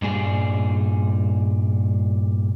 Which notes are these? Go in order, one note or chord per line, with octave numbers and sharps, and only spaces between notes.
G2 A#2 G3 G#4